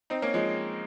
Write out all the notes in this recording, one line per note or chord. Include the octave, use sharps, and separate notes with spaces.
C4 D#4
A#3 C#4
F3 G#3